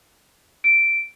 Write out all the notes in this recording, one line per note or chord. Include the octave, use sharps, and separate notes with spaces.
D7